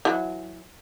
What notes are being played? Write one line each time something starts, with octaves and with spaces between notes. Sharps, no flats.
E3 F#3